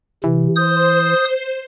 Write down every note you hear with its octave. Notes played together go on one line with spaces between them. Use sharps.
C3 E3
C5 D#6 G6